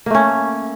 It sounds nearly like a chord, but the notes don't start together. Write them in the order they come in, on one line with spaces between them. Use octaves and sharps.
A#3 A3 C#4